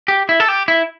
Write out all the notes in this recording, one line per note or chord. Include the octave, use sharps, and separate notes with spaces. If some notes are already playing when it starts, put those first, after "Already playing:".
G4
E4
A4
G4
E4